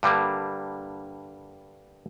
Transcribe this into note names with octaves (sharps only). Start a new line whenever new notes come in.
G2 D3 G3 A#3